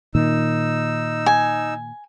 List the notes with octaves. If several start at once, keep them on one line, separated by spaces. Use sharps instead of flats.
A#2 D#3 D#4 E6
G#5